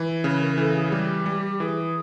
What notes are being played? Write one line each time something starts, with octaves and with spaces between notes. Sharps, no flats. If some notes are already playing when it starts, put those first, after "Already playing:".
Already playing: E3
C#3 B4
A#4
A#4
E3 A4
G#4
G3 G4
G3
E3 G#4